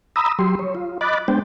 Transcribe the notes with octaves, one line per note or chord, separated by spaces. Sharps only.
A#5 B5 D#6 E6
F#3 G4 C6
C#5
F4
D#5 B5 D6 F#6 A6
G#3 B3 D4 C5 G5